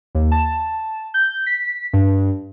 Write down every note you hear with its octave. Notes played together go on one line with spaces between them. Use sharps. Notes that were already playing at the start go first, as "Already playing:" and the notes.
D#2
A5
G6
B6
G2